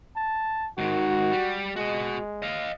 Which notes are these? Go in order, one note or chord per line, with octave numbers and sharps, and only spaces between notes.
A5
G#2 D#3 F#4
G3
G#3 F#4 D#5
D#5 F5